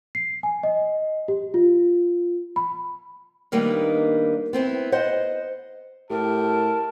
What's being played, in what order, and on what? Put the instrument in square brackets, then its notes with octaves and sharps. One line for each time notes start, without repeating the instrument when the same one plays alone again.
[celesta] C7
G#5
D#5
G4
F4
B5
[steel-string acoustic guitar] D#3 G3 A#3 B3 D4 D#4
B3 C4 E4
C5 D#5 F#5
[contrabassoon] A2 [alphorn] G4 [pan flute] A#4 [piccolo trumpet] A5